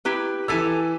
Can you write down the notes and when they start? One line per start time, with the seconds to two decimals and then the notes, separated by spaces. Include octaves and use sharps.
0.05 E4 G4 B4
0.48 E3 G4 A4 G#5 E6